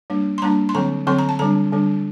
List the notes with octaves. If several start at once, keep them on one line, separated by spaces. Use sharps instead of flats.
G3 A#3 D4
C6
G3 A#3 D4 A#5
C6
D3 F#3 C4 A#5
D3 F#3 C4 C6
A#5
A5
D3 G3 D4 A#5
D3 G3 D4